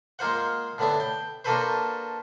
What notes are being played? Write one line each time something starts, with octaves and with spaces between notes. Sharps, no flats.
G#3 A#3 F4 C5 F#5
A2 D3 B3 D4 E4
G5
A#3 D4 F#4 A4 B4 C5